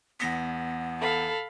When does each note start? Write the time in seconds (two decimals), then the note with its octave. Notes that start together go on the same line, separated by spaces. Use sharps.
0.20 E2 B3 A#6 B6
1.00 A4 F5 B5